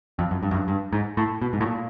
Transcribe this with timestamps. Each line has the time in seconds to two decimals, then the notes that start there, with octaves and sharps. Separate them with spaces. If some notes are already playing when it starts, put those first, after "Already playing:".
0.19 F2
0.31 F#2
0.43 G2
0.51 F#2
0.54 G2
0.68 G2
0.93 G#2
1.17 A2
1.42 B2
1.53 G#2
1.61 A2
1.66 A#2